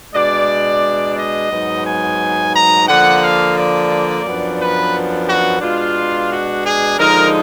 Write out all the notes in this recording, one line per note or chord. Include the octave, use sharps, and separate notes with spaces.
B2 G#3 D4 D5
D#5
G#2 F#3 B3 D#4
G#5
A#5
D3 F3 A#3 F#5
F5
D5
F#2 F3 B3 D4
B4
F#4
B2 G#3 D4 F4
F#4
G#4
D3 F3 G#3 D#4 A#4